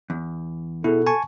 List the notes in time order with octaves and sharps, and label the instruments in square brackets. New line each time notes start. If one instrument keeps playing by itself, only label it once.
[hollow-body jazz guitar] E2
[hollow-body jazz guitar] B2 [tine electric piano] E4 G#4 [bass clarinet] A4
[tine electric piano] G#5 A5 C#6